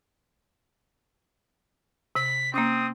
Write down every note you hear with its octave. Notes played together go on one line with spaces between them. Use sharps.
C3 B6
A#3 C4 C#4 D#6